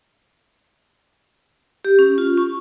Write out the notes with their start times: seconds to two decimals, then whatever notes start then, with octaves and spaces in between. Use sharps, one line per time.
1.85 G4
1.99 C#4
2.18 F4
2.37 C#6